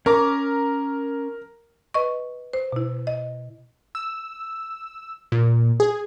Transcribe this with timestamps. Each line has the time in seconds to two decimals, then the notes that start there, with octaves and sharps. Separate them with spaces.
0.06 C#4 A#4 A#5 D6
1.94 B4 D#5 C#6
2.53 C5
2.72 B2 E4
3.07 D#5
3.95 E6
5.32 A#2
5.80 G#4